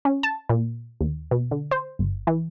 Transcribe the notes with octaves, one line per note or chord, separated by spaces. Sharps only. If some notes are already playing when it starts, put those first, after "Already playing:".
C#4
A5
A#2
D#2
B2
D3
C5
G1
E3